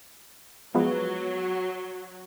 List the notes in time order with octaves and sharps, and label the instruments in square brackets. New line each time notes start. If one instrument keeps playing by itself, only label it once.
[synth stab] F3 G#3 B3 [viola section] F#3